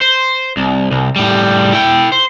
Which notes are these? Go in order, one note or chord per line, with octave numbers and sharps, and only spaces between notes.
C5
C2
C2
A2 G3
E4 G5
C5